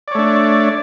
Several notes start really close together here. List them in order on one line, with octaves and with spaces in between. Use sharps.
D5 C#5 A3 D4